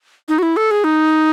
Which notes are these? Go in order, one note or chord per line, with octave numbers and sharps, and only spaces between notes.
D#4
F#4
E4
A4
G#4
D#4